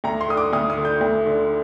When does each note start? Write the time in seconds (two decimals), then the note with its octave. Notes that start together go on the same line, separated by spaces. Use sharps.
0.04 D2 A#5
0.21 C6
0.28 D3 D#6
0.37 D6
0.53 D2 D#6
0.70 D#6
0.78 D3
0.85 G6
1.01 D2
1.26 D3